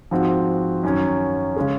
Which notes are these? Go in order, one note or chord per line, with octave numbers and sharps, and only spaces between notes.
G#2 F3 C4 F#4
F#2 D#3 F#3 C#4
C#3 G#3 C#4 G#4